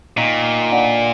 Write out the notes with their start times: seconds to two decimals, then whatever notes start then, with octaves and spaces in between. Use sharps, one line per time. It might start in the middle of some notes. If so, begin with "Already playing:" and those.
0.17 A#2 D#3
0.72 D3